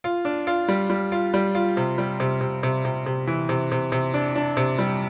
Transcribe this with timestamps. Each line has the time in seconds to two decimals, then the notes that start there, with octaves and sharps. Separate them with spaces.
0.04 F4
0.25 D4
0.47 F4
0.68 G3
0.90 G3
1.12 F4
1.34 G3
1.55 F4
1.77 C3
1.98 G3
2.20 C3
2.41 C3
2.63 C3
2.85 C3
3.06 C3
3.27 E3
3.49 C3
3.72 C3
3.92 C3
4.14 D4
4.36 D4
4.57 C3
4.78 G3